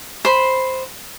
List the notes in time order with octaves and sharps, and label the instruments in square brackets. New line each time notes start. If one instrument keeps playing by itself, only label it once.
[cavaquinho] C5 B5